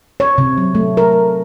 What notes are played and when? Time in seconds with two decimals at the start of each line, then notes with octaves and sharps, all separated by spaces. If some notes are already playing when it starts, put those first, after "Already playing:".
0.20 C#5
0.38 C3
0.58 F#3
0.75 A3
0.97 A#4